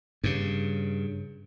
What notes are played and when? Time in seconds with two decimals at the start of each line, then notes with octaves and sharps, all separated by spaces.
0.24 G2 C#3